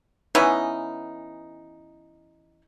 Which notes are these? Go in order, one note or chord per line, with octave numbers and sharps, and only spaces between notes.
E3 B3 C#4 D#4